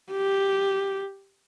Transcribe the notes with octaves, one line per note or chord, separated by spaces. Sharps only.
G4